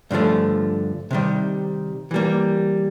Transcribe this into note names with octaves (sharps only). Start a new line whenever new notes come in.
G2 D3 F3 A3
C3 D#3 G3
E3 G3 A#3